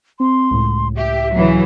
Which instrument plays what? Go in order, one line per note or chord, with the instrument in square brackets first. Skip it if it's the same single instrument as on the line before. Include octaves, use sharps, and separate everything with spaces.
[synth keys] C4 [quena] C6
[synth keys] C#2 A2
[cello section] G4 [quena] E5
[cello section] C#3 E3 F#3